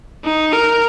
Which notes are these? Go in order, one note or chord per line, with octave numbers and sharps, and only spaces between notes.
D#4
A#4